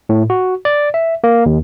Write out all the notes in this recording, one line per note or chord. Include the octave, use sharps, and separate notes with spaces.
A2
F#4
D5
E5
A#3
D#2